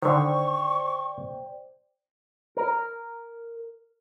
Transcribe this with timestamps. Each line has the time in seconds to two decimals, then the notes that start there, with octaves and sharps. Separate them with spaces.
0.02 D3 D#3 C5 D5 G5 C#6
2.57 A#4